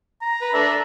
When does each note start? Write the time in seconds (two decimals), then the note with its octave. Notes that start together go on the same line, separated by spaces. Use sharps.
0.22 A#5
0.41 B4
0.54 D4 A4 E5
0.70 A4